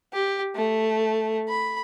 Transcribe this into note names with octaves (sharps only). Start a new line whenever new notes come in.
G4
A3
B5